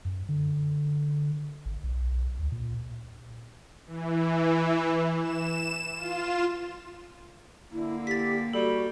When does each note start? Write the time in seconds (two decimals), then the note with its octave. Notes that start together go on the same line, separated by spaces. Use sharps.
0.05 F#2
0.29 D3
1.66 G#1
1.83 B1
2.39 D2
2.52 A#2
3.87 E3
5.20 E7
5.95 F4
7.72 D3 A#3 E4
8.07 G4 A6 B6
8.53 G3 F#4 A4